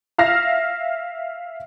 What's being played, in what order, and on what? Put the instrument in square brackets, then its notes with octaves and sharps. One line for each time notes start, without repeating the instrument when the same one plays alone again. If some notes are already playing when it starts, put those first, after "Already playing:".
[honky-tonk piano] E5 F5 F6 A#6